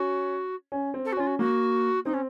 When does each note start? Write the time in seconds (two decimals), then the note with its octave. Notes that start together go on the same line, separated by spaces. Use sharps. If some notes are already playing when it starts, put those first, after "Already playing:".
Already playing: C#4 F#4
0.72 C#4
0.94 C4
1.05 A4
1.12 F#4
1.17 C#4 F4
1.27 F#4
1.39 A#3 F#4
2.05 C4 D#4
2.14 C#4